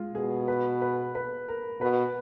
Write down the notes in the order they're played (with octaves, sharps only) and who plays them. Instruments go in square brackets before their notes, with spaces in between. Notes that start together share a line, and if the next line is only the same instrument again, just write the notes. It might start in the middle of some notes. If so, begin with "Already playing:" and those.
Already playing: [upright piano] G#3 F4
[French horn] B2 [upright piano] G#4
[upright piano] B4
B4
B4
A#4
[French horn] B2 [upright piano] B4